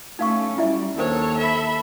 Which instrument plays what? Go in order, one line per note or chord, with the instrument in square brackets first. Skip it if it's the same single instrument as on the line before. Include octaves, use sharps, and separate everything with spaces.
[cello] A3 C#4 [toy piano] D#4 F5 C#6
[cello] G3 [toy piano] E4 D5 E5
[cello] D#2 A4 [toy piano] D4 A#4 C5 [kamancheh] C#5
[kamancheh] E5 B5